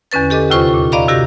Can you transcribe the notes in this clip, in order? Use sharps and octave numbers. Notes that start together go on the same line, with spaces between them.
E2 D3 C#4 B4 A6
G4 A4 D#5 D6
D#2 C3 F4 C5 C#6
A#2
D5 D#5 F5 A#5 B5 D6
F#2 C3 F#4 G4 A#6